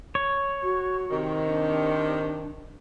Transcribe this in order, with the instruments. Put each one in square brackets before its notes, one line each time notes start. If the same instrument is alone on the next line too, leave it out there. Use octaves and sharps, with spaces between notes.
[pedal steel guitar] C#5
[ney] F#4
[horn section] C3 D#3
[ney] D4